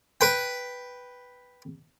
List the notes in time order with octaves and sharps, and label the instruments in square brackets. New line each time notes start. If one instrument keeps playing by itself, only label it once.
[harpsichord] B4 G5